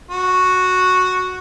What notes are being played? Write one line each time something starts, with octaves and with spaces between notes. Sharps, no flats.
F#4